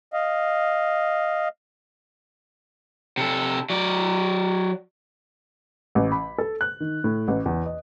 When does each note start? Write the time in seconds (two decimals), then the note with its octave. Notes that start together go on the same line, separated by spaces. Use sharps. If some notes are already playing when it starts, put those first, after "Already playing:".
0.13 D#5 F5
3.18 C3 A4
3.70 F#3 D5
5.95 A1
6.12 B5
6.38 A4
6.61 F#6
6.80 D#3
7.04 A2
7.28 A1
7.46 E2
7.66 D#5